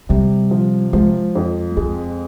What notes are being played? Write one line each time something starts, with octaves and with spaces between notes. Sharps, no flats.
C3 G3
F3
F3 G#3
F2
G#3 C4